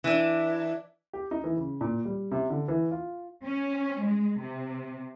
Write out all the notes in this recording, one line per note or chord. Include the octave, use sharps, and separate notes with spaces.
E3 D4
G4
D#4
E3
C#3
A#2
G3
C3
D3
E3
F4
C#4
G#3
C3